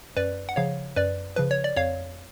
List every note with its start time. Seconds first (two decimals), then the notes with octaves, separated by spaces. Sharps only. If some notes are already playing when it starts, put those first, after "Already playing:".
0.17 F#2 B4 D5
0.49 F#5
0.56 C#3 F3 C#5 F5
0.96 F#2 B4 D5
1.36 C#3 F3 B4
1.51 C#5
1.64 D5
1.77 F2 C#5 F5